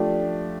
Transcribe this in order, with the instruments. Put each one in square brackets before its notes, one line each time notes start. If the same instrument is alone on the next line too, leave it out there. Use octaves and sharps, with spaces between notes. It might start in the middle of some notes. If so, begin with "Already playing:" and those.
Already playing: [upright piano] F3 A3 D4 G4